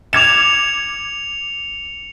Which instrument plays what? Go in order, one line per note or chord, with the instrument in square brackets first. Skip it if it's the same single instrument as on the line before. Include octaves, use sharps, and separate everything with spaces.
[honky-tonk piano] D6 G#6 E7 [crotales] C#7 F7